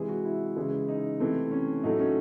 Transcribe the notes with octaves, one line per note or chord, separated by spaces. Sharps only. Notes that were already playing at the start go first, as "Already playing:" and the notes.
Already playing: C3 E3 G#3 G#4
F#4
E4
C#3 E3 G#3
D#4
C3 E3 A3 C4
C#4
A2 F#3 A3 D#4
C#4